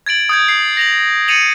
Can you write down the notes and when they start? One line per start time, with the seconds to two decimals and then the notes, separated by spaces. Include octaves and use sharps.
0.06 G#6 A6 D7 F#7
0.29 D#6 G6 G#6
0.48 C7
0.77 A#6 F7 F#7
1.28 A6 C#7 D#7 F7 F#7